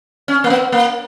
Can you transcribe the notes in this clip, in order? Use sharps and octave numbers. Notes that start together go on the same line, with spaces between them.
C#4
A#3
B3
A#3